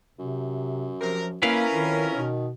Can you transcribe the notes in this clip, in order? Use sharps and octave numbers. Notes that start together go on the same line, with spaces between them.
F#2 C3
C3 F3 A#4
A#3 C#4 E4 A#4 B4 F5
F2 D#3
B2 D#3